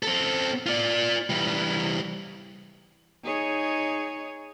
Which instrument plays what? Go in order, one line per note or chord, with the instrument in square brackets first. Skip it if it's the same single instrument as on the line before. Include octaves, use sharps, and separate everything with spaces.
[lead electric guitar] C4 A4
F4 D5
E3 G3
[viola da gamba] D#4 G#4 C#5